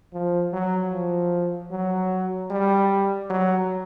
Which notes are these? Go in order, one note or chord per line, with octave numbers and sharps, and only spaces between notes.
F3
F#3
F3
F#3
G3
F#3